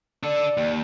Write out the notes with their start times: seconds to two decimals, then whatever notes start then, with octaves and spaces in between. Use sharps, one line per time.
0.23 D4 A4 D5
0.57 D#2